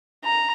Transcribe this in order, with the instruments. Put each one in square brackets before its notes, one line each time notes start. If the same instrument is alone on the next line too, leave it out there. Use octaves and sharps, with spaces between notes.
[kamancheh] A#5